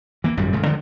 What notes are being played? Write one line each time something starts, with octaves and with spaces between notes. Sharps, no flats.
E3 A#3
G#1 F#2 A#2 G3
D#1 G#2 C#3 A3
D3 D#3 F3 G#3